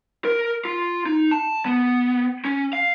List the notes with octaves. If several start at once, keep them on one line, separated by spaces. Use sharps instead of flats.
A#4
F4
D#4
A5
B3
C#4
F5